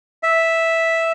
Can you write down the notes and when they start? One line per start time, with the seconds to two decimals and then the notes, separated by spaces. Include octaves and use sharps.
0.23 E5